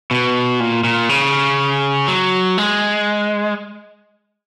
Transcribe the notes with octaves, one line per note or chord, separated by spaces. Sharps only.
B2
A#2
A#2
C#3
F#3
G#3